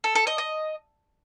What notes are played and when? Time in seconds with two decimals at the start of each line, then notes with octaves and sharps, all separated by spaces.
0.04 A4
0.15 A4
0.27 D#5
0.38 D#5